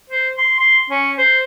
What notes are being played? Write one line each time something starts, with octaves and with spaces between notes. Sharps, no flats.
C5
C6
C6
C#4
C5